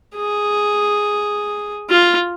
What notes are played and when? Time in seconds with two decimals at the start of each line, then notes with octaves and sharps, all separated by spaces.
0.16 G#4
1.90 F4